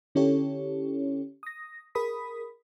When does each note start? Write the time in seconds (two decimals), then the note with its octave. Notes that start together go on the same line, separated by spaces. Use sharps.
0.15 D3 C#4 E4 G4 A4 C#5
1.43 D#6 A#6
1.95 G#4 A#4 B5 D#6 B6